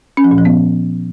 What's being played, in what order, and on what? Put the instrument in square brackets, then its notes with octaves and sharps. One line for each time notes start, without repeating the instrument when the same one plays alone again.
[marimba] C#4
F3
A#2
F3
B3